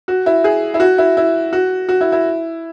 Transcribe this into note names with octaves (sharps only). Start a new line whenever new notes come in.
F#4
E4
G#4
E4
F#4
E4
E4
F#4
F#4
E4
E4